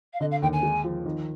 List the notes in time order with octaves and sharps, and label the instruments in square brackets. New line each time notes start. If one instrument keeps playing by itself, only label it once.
[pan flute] F5
[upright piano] D3 [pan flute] D#5
[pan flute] F5
[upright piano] D#2 [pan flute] G5
[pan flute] G#5
[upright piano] G#3
F3
D#3